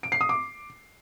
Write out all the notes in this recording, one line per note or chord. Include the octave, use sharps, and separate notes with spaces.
D7
C7
D#6
D6